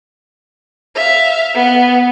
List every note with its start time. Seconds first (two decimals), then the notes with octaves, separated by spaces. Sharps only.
0.96 E5 F5
1.54 B3